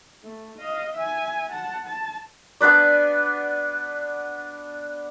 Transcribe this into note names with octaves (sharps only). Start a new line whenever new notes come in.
A3
D#5 F5
E5 G#5
F#5 A5
A5
B3 D4 B4 D5